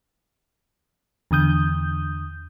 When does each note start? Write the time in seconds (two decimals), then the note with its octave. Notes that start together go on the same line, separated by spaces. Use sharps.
1.31 E2 D3 D#6 G6